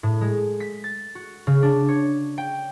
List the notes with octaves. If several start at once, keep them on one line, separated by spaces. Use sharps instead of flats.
A2
G#3
B6
A6
F#4
C#3
D4
C#5
G5